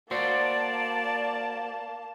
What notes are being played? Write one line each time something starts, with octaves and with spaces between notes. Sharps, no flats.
A#3 F#4 C5 D5 A5